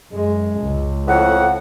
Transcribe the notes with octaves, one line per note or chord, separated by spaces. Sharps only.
F#2 G#3
C#2
F2 A2 F#5